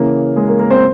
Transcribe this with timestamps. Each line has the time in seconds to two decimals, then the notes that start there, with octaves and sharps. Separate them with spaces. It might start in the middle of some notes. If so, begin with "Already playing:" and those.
Already playing: C#3 E3 A#3
0.36 G#3 G#4
0.47 A#3 A#4
0.59 A#3 A#4
0.70 C4 C5